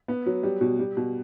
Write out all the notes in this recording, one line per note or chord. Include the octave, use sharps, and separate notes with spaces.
B3
F#3
G3
B2
G3
B2